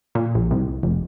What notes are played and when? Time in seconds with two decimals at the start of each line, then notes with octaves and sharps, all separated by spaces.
0.15 A#2
0.35 A#1
0.51 C2
0.83 F1